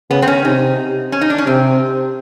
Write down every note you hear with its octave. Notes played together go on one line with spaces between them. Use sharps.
C#3 B3
C4
C#4
C3 D#4
C#4
D#4
D4
C#4
C3 C4